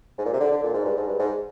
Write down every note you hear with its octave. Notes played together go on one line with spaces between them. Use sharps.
G#2
A#2
C3
D3
D3
A#2
G#2
G2
G#2
G2
G#2